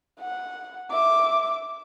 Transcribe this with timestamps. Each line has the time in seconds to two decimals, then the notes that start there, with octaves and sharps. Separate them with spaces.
0.20 F#5
0.91 E5 D6